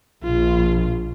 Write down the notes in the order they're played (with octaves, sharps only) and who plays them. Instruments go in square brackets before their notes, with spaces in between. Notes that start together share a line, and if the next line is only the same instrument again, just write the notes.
[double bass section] A#1 [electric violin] F4